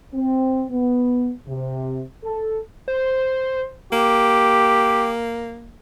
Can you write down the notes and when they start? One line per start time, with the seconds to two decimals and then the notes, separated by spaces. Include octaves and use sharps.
0.14 C4
0.71 B3
1.48 C3
2.24 A4
2.88 C5
3.92 A#3 G4